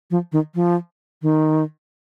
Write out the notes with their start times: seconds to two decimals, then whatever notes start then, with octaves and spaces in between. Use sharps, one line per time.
0.11 F3
0.32 D#3
0.55 F3
1.22 D#3